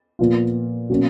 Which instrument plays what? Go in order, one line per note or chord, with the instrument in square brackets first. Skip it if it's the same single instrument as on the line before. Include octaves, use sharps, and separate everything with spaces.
[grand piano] A#2 F3 B3 F4
B2 F#3 A#3 C#4